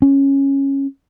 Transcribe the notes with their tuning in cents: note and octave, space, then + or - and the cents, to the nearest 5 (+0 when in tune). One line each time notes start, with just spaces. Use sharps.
C#4 -10